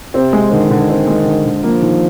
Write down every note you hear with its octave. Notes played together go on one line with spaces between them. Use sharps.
C3 C4
G#3
D3 D#3
D3
C4
G#3
D3
D3
F3 A#3
D#3